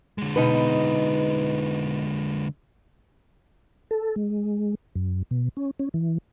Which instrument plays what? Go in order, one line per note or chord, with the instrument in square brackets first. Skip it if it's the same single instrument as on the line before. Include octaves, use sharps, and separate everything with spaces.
[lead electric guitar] D3 G#3
[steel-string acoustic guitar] B2 D#4 B4
[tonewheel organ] A4
G#3
F#2
B2
C#4
C#4
E3